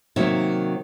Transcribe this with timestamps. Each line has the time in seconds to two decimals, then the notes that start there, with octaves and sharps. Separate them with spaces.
0.16 C3 D#3 F#3 A#3 E5